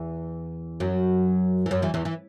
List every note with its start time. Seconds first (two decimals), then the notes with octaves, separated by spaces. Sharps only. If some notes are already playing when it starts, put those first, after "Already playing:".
Already playing: E2 E3
0.80 F#2 F#3
1.66 E3
1.71 F#2 F#3
1.82 E2 E3
1.94 E2 E3
2.05 E3